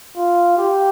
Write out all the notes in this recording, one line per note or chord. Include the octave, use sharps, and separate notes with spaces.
F4
G4